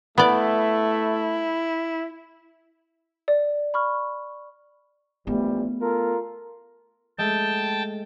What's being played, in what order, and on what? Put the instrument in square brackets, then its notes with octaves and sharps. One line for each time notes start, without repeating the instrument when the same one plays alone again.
[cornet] A3 [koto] B3 D5 [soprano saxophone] E4
[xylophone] D5
B5 C#6 F6
[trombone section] A#1 E3 G3 [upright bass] A3 B3
[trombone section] F4 A4 A#4
[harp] G#3 A3 [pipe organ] G5 A5